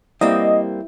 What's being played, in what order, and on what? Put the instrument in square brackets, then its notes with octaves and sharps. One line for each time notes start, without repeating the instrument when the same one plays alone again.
[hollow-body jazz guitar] G3 A#3 C4 [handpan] E4 [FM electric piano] D#5